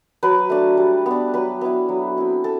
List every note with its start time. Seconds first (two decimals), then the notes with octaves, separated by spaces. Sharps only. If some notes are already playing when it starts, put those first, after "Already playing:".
0.23 F#3 B4
0.50 A3 D4
0.77 G3
1.06 B3 D4
1.34 F#3 B4
1.61 B3 E4
1.89 F#3
2.17 C4 E4
2.44 A4